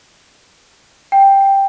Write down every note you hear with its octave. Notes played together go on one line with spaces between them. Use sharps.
G5